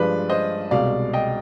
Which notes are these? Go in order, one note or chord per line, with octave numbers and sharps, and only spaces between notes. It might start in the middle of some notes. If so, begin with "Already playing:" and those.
Already playing: G2 F3 G#3 B4 D5
C5 D#5
C2 B2 G#3 D5 F5
D#5 G5